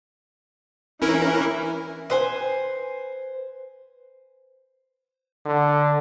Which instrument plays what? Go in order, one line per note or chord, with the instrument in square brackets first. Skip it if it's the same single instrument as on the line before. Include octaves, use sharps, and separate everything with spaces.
[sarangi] E3 [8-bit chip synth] C#4 E4 A#4
[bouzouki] B4 C5 G#5
[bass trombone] D3